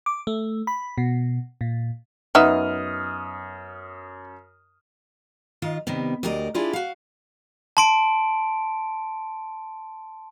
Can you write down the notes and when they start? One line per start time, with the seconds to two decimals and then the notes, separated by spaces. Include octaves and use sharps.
0.06 D6
0.27 A3
0.67 B5
0.98 B2
1.61 A#2
2.35 F#2 B3 D#4 E5 D#6 F6
5.62 D#3 F4 D#5
5.87 C3 D#3 G3 B3
6.23 D2 G4 A#4 D5 D#5
6.54 D4 E4 F4 G4 G#4 D5
6.73 F#4 F5
7.77 A5 C6 D7